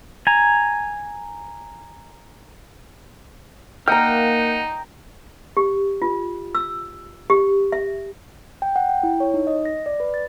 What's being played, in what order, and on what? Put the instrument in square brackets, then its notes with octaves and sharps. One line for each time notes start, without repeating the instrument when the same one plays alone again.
[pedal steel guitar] G#5 A#5
[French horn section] A#3 [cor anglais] D#4 [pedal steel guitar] F#5 F6 [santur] G5 A#5
[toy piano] G4
F4
E6
G4
E5
[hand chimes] G5
F#5
G5
E4
C#5
D#4
D#5
A#6
D5
B4
A6